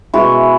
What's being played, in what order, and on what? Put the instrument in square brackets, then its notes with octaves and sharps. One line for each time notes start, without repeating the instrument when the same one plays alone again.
[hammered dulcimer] B2 G#3 E4 F#4